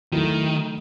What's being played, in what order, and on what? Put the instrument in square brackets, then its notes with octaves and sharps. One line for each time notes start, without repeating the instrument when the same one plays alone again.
[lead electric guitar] D#3 [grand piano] F#3 A3 E4